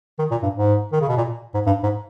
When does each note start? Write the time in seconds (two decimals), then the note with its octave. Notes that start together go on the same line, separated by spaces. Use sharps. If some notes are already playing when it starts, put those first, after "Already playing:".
0.19 D#3
0.31 A#2
0.43 G2
0.55 G#2
0.92 D#3
1.01 C#3
1.08 B2
1.17 A#2
1.54 G#2
1.66 G2
1.83 G#2